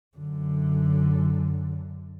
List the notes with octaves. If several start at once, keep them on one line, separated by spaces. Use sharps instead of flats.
F#2 D3